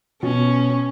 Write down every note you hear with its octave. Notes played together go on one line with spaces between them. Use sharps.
B2 C#4